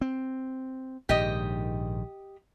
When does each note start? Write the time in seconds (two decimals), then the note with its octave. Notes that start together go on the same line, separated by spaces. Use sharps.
0.01 C4
1.09 A#1 G#2 D#3 G4 D#5